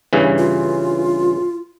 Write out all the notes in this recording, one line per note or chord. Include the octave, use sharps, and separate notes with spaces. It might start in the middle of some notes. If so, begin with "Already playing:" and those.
G2 C#3 E3
F4